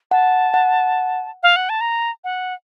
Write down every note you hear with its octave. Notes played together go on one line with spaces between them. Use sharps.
F#5 A5
F#5
F5
F#5
A5
A#5
F#5